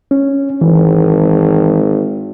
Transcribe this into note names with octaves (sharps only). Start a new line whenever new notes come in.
C#4
G#1 E3